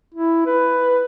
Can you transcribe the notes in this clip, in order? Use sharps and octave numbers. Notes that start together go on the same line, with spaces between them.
E4
B4